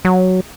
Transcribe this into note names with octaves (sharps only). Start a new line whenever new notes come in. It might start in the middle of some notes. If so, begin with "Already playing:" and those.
F#3